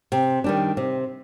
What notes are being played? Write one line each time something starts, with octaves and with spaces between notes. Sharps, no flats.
C3
D#3 G3 D4
C3